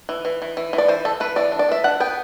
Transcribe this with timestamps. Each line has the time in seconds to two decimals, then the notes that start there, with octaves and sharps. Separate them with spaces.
0.09 E3
0.25 E3
0.42 E3
0.57 E3
0.73 E3
0.78 D5
0.88 E3 C5
1.05 E3 A4
1.20 E3 B4
1.36 E3 D5
1.52 D4
1.59 D5
1.69 E3 E5
1.84 D4 F#5
2.00 B3 G5